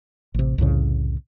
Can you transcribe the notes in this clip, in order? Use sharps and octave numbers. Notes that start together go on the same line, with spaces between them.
A1 C3
C2 F2 A2 C#3